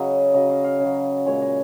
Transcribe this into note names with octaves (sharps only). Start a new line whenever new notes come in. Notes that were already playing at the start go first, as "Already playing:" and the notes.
Already playing: C#3 F#3 D#5
C#3 F#3 D#5
F5
F5
C#3 F#3
A#2 G#3 C#5
D#5